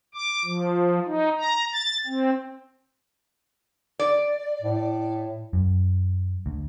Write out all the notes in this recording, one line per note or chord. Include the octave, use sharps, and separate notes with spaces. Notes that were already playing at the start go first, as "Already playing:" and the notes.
D6
F3
D#4
A#5
A6
C4
D5
A2
F#2
D2